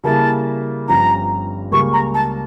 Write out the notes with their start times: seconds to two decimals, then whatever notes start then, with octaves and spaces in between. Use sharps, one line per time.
0.04 C#3 G3 A#3 E4 A5
0.88 G1 G2 F3 C#4 G4 A#5
1.71 C#2 C#3 G3 A#3 C#6
1.93 A#5
2.14 A5